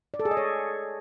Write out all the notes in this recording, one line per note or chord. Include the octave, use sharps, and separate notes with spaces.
D5
A4
G#4
D#5
C#5